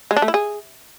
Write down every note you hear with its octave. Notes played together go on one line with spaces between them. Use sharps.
G#3
D4
A3
E4
G#4